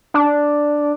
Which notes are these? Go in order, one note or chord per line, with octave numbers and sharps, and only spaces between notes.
D4